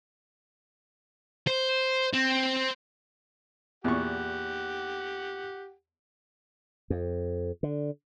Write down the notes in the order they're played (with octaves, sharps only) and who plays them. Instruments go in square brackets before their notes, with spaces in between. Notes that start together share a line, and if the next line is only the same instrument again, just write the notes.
[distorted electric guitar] C5
C4
[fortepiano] E2 A#2 C#6 [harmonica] G4 F#5
[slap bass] F2
D3